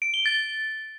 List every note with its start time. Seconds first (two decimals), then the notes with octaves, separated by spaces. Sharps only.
0.02 D7
0.14 G7
0.26 A6